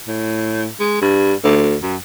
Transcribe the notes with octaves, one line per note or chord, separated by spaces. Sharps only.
A2
G#3
G2
D2
F#2